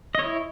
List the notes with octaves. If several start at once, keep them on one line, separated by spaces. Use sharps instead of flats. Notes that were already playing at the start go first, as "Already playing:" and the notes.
E4 C#5 D#5